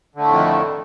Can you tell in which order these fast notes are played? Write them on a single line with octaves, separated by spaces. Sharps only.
D3 A3 A2 F2 D#3